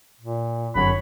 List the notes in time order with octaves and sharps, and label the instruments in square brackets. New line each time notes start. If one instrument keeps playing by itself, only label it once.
[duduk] A#2
[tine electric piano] G1 F#2 [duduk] C#5 [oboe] B5